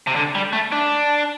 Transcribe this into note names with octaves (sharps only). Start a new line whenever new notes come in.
C3
D3
G3
A3
D4